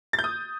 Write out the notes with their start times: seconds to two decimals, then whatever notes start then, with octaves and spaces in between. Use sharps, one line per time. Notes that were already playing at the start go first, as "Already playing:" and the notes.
0.13 A6
0.19 G6
0.24 D#6